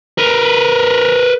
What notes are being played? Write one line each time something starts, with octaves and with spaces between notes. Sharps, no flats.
A#4 B4